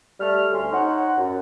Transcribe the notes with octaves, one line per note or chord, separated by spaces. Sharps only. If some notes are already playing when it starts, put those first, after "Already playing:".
G3 A3 F6
D2 C#4 C6
D#4 C5 C#5 F#5
F#2